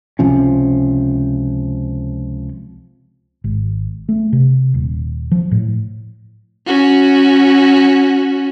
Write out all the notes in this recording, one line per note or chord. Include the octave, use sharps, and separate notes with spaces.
C#2 C3 F3 C#4
G#1
A3
C3
D#1
F3
A2
C#4 F#4